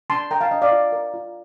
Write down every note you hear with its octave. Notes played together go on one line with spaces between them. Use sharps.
D4 A5 C6
A#4 G5 A#5
F5 A5
D4 D#5
D5 F5
F4
A#4
F4